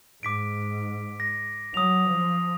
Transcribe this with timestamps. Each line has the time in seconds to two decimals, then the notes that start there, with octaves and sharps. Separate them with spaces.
0.23 G#2 D6 B6 D7
1.20 A#6
1.74 F#3 D#6 F7
2.08 F3